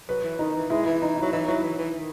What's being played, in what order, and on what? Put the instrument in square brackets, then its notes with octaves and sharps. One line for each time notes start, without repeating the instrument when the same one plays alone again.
[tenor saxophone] F#3 [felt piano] B4
[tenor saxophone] E3
[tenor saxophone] D#3 [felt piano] D#4
[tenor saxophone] E3
[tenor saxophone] G#3 [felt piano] E4
[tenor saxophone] E3 [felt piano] E4
[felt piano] D#4
[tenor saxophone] F#3 [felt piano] E4
[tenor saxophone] E3 [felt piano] D#4
[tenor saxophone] F#3 [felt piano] E4
[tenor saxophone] E3
E3
D#3